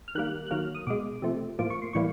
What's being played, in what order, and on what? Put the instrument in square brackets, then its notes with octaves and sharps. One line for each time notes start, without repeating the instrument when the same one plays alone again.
[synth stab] F6
D#3 G3 A#3 F#6
F#6
D#3 F#3 A#3 F6
D#6
B2 G#3 D6
C3 F3 A3
A2 F3 A#3 D6
C#6
C6
A2 E3 G3 A#3 C#6